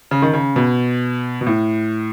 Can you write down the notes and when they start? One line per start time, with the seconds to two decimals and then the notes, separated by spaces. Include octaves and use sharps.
0.11 C#3
0.22 D#3
0.33 C#3
0.56 B2
1.41 B2
1.46 A2